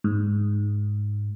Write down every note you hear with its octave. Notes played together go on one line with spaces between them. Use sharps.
G#2